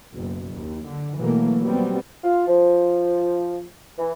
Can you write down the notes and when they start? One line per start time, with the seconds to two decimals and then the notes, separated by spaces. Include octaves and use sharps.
0.13 F#1 B1
0.54 D#2
0.88 D3
1.19 B2 E3 F#3 A3 A#3
1.63 F#3 G3 B3 C4
2.23 F4
2.47 F3
3.98 E3